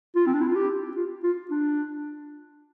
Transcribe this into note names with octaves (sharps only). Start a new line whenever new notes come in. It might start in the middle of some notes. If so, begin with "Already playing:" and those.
F4
C4
D4
E4
F4
G4
F4
F4
D4